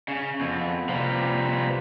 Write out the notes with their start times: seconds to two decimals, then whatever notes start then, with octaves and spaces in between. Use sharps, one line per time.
0.08 C#3
0.41 F2 B3
0.89 C3 F3 G3 A#3 B4